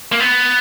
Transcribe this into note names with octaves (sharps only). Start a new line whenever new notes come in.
A#3
B3